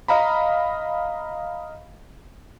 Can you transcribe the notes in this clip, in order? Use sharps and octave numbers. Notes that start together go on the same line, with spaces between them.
D#5 F5 A#5 B5